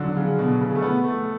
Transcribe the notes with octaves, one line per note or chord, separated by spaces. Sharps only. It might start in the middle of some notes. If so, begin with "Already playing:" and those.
Already playing: D3 F#3
C#3
B2
C#3
A3
B3
A3